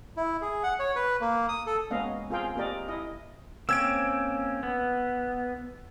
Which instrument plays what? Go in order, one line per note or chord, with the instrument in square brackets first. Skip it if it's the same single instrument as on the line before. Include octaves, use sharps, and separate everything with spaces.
[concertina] E4
G#4
F#5
C#5
B4
A#3
D#6
A4
[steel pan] G#3 A#3 B3 C#4 D#5 F5
C4 F4 G#4 A#4 F5 G5
A#3 C4 G4 A#4 D5 D#5
E4 D#5
[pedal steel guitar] A#3 C4 C#4 [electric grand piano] E6 G#6 D7
[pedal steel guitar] B3